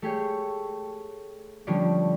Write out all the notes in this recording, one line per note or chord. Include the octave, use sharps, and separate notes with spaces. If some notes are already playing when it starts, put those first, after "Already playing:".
A3 G4 G#4 C#5
D3 F3 G3 A3 C#4 D4